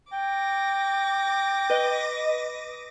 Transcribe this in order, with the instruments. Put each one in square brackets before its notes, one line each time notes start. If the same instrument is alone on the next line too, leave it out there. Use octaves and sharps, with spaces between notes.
[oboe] G5 [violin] D6 A#6
[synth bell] B4 D#5